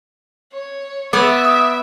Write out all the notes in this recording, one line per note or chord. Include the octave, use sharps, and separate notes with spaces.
C#5
B3 C#5 D5 E5 D6 D7
D#6